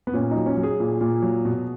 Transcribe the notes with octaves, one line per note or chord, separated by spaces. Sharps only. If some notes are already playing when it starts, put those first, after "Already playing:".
B3
A#2 C#4
F#3 D#4
C#4
F#3
G#4
A#2
A#2
F#3
B2